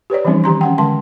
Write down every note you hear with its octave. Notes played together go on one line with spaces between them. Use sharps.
G4 B4 C#5 D5
E3 F3 G3 C4 C#4 D#4
D#3 G4 A#5 C6
C#4 F#5 G5
D3 G#3 A5 C6